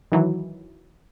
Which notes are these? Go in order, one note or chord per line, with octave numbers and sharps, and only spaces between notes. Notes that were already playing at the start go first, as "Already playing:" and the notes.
D#3 E3 F#3